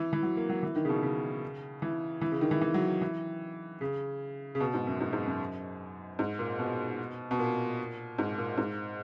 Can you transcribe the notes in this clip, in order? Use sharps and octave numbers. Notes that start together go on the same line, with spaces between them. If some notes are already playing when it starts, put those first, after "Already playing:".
Already playing: E3
E3
F#3
A#3
F#3
E3
D#3
C#3
B2
C#3
E3
E3
C#3
D#3
E3
E3
F#3
E3
C#3
C#3
B2
G#2
F#2
G#2
G#2
F#2
G#2
A#2
B2
B2
A#2
G#2
A#2
G#2